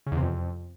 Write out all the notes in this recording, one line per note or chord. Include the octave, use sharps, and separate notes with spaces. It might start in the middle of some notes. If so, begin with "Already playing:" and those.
C#3
E2
C3
F2